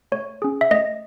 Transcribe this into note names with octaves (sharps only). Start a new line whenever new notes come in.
A3 C#5
C#4 G#4
E5
A3 D#5